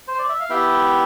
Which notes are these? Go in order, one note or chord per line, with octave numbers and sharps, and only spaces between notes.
C5
D5
E5
F5
B3 E4 G4 E5 G5